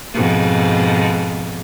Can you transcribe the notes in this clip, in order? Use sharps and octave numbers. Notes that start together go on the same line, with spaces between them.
F2 G#2 B2